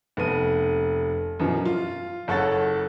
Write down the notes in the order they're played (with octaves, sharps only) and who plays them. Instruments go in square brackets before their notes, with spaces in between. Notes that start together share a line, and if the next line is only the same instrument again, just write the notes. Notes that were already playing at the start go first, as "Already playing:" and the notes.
[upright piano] F1 B3 D#7
F#2 B2 E3 F3
F4
F#1 A4 C#5 F#5 A6